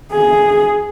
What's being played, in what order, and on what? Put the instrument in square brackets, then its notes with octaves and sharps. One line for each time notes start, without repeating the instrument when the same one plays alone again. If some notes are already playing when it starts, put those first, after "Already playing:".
[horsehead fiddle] G#4